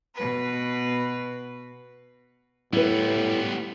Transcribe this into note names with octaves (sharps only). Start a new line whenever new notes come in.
B2 B4
A2 G3 B3 E4 B4